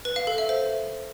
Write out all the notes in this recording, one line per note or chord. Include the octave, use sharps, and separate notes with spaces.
B4
F5
A4
E5
C5